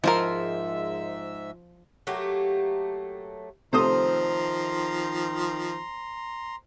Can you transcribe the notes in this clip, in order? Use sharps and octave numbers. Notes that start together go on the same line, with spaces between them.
G#2 F3 G#3 F4 A#4 E5
F#3 A3 A#3 G4
C3 D#3 F3 A3 C5 A#5 C6 D#6